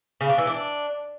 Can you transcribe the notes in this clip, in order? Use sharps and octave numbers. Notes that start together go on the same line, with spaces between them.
C#3
D4
E3
D4